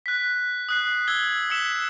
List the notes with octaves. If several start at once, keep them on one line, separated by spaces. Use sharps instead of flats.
F#6 B6
D#6 F#6 C7
E6 G#6 G7
E6 B6 C#7 E7 G7